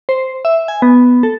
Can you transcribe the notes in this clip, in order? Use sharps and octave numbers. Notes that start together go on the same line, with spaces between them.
C5
E5
G#5
B3
A4